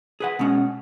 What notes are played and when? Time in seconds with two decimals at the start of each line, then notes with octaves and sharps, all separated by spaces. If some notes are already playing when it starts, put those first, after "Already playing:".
0.20 G#4 B4 F#5
0.39 B2 G#3 C#4 F#5